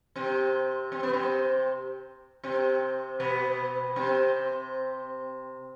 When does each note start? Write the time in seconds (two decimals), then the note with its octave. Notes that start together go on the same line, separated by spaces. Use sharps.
0.16 C3 C4
0.92 C4
1.03 B3
1.13 C3 C4
2.43 C3 C4
3.20 B2 B3
3.96 C3 C4